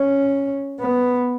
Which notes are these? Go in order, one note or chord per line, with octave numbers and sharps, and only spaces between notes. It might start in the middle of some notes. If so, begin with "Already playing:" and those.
Already playing: C#4
B3